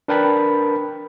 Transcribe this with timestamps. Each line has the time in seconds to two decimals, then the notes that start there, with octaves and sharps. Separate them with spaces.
0.08 D4 A#4 B4 G5 A5 B5